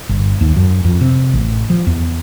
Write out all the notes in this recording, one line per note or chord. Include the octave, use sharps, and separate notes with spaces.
G1
D#2
F#2
F2
C3
A1
F3
E2